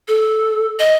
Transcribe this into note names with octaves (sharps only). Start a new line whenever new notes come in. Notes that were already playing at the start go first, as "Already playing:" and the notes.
A4
D#5